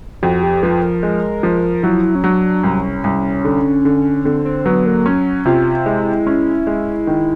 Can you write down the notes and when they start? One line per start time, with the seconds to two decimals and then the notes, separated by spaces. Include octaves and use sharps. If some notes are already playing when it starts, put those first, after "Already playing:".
0.23 F2 F#4
0.43 G4
0.63 F3 B4
0.83 A#4
1.03 G#3
1.43 F3
1.83 F#3 E4
2.15 C#4
2.23 F#3 D4
2.64 C2 C#4
3.04 C2
3.45 D3
3.85 D3
4.25 D3 C4
4.45 C4
4.65 F#3 B3
4.86 A#3
5.06 C#4
5.46 C3 F4
5.86 G#3 E4
6.27 C#4
6.67 G#3
7.07 D#3